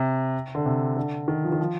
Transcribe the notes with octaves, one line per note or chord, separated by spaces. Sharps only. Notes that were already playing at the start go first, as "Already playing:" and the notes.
Already playing: C3
D3
C3
D3
D#3
F3
D#3
F3